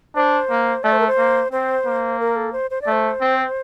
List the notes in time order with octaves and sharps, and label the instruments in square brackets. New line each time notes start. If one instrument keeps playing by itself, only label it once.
[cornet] D4 [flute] C5
[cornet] A#3
[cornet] A3 [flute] D5
[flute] C5
A#4
C5
[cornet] A#3
[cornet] C4 [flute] C5
[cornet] A#3
[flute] A#4
A4
C5
C5
D5
[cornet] A3
[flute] C5
[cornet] C4